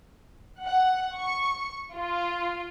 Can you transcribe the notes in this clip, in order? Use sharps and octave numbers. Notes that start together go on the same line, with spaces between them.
F#5
C#6
F4